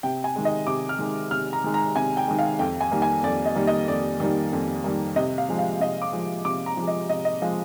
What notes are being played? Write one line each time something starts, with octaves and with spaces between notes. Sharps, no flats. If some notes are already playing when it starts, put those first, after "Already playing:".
C3 G5
G#5
D#3 G#3
D#5
C3 D6
F6
D#3 G#3
C3 F6
A#5
D#3 G#3
A#5
C3 G#5
G5
D#3 G#3
F5
F2 G5
G#5
D#3 G3 A#3
G#5
F2 D5
D#5
D#3 G3 A#3
D#5
F2 D5
D#3 G3 A#3
F2
D#3 G3 A#3
C3 D#5
F5
F3 G#3
F5
C3 D#5
D6
F3 G#3
C3 D6
A#5
F3
G#3
D#5
C3 D#5
D#5
F3 G#3 F5